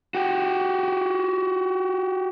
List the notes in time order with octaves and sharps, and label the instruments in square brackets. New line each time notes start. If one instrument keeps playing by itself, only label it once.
[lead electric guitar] F#4 G4